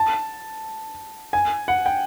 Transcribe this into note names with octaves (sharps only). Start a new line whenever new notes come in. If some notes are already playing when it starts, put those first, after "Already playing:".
Already playing: A5
G#5
F#5
G5